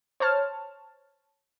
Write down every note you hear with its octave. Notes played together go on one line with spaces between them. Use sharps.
C5 C#5 A5 F6